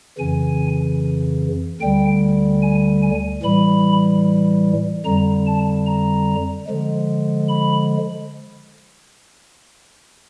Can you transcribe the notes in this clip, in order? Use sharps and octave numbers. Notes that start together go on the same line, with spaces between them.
F2 C#3 E3 G#5
D2 D3 G3 G5
G#5
G#5
A2 E3 G3 B5
F2 D3 G3 A#5
A5
A#5
D3 F3 G#3
B5